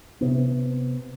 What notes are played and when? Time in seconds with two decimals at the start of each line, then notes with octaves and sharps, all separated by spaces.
0.21 C3 B3